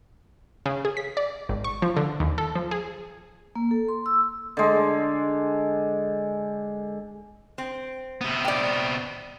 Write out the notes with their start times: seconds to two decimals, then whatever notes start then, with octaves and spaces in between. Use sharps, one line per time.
0.66 C#3
0.85 G#4
0.97 B6
1.17 D5
1.49 G#1
1.64 C#6
1.82 F3
1.97 D3
2.20 D#2
2.38 A4
2.55 F3
2.71 G#4
3.56 A#3
3.71 A4
3.88 C6
4.06 E6
4.57 D3 G#3
7.58 C4
8.21 C3 B3
8.45 D5 G5